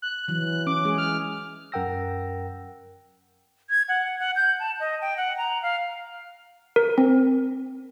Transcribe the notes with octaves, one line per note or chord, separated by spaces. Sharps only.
F#6
E3 F#3
C#4 D6
G#3 G#4
F6
F#2 A#4 F#5 G5 E6 A#6
G#6
F#5
F#5
G6
A5
D#5
G5
F#5
A#5
F5
A#4
C4